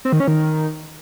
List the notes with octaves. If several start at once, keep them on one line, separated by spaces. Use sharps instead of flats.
C4
D#3
C#4
D#3